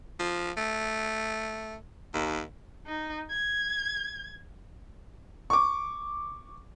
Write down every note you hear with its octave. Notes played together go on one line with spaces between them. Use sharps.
F3
A3
D#2
D#4
G#6
C#6 D6